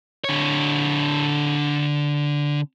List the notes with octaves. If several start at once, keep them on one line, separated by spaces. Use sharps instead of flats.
D3 C#5